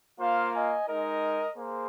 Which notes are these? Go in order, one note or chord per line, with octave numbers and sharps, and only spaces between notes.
A#3 F4 C5 F5
D#5 G#5
G#3 D#4 A#4 D#5
A#3 G#4 C5